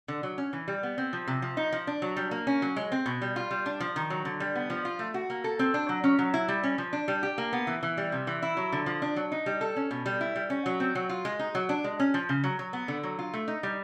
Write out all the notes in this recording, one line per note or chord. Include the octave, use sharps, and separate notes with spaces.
D3
F#3
C#4
E3
G3
B3
C4
F3
C3
F3
D#4
F3
D4
F#3
G3
A#3
C#4
F#3
G#3
C4
B2
G3
F4
G3
D4
F3
D#3
F#3
D3
G3
B3
F3
F4
A3
F#4
A#3
A4
C4
D4
F#3
C#4
F#3
E4
G3
C#4
F3
D4
G3
G4
A#3
B3
E3
E3
G3
C3
E3
E4
F#3
D3
F3
D4
F#3
D#4
G3
A4
C#4
B2
G3
E4
G3
C#4
F#3
C4
F#3
F4
G#3
D#4
F#3
D4
G#3
C#4
F3
C#3
F#3
F#3
B3
D3
F#3
F4
A3
D#4
G3